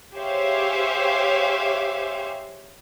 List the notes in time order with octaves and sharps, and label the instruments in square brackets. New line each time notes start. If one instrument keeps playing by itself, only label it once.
[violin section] G4 G#4 C5 C#5 E5 F5